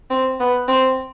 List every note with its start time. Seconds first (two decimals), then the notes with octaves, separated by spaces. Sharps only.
0.10 C4
0.40 B3
0.68 C4